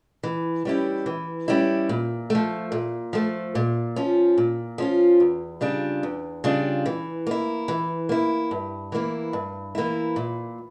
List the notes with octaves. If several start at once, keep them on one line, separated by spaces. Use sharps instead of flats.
E3
G3 C#4 E4 G4
E3
G3 C#4 E4 G4
A#2
F3 A3
A#2
F3 A3
A#2
F3 C#4 F4
A#2
F3 C#4 F4
E2
C#3 G3 D4 F4
E2
C#3 G3 D4 F4
E3
A#3 E4
E3
A#3 E4
G2
E3 A#3 E4
G2
E3 A#3 E4
A#2